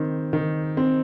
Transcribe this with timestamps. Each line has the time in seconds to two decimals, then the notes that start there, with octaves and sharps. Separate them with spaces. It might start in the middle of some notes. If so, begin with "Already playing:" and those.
Already playing: D#3 C4
0.33 D#3
0.77 C4